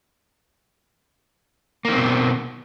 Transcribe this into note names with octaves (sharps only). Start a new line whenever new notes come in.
B2 D#3 A#3 C4